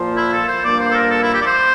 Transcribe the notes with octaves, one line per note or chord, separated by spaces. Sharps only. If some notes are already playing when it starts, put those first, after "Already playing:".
Already playing: A#2 F3 A#3 F4 C5
E4
A4
C5
G2 F3 A#3 D5
C5
A4
A#4
A4
E4
G4
D5
C5